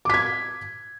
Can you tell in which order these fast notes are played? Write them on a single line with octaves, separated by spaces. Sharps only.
D6 B6 G#6